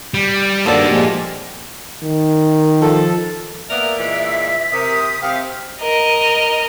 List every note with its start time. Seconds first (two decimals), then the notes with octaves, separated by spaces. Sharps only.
0.14 G3
0.66 G2 D#3 A#3 F#4 A4 D5 A5
0.89 A#2 F3 G#3 G4
2.04 D#3
2.81 F3 A4
3.69 A#3 B3 A#4 D5 E5
3.98 A#2 E3 G#3 B6
4.72 C3 A#4 D#6
5.22 C3 F5 G5
5.81 A#4 D#5